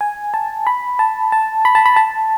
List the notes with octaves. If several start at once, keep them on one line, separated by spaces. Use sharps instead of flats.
G#5
A5
B5
A5
A5
B5
A5
B5
A5